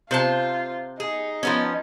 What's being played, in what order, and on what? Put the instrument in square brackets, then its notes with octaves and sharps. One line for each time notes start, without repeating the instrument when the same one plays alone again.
[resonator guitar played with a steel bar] C3 C5 A5 [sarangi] F4
[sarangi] D#4 [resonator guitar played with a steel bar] G#4
[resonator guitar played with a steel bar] F3 B3 C#4